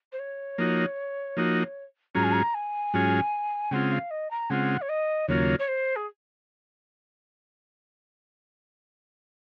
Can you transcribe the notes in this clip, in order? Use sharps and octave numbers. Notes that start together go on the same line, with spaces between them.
C5
C#5
F3 A#3 D#4 F#4
F3 A#3 D#4 F#4
G#2 F#3 C#4 F4 G#4 A#5
G#5
A#5
G#5
G#2 F#3 C#4 F4 G#4
C#3 G#3 C4 F4 F#5
F5
D#5
A#5
C#3 G#3 C4 F4 F#5
C#5
D#5
D#2 C#3 F#3 A#3 F4 C#5
C#5
C5
G#4